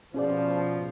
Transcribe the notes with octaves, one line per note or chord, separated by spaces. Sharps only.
B2 F3 C#4 G#4 D5